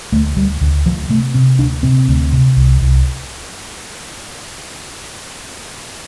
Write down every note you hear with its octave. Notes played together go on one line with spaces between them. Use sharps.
D2 A3
D2 G3
D2 D3
D2 F3
C3 A3
C3 C4
D2 D4
C3 C4
D2
C3
C2
C2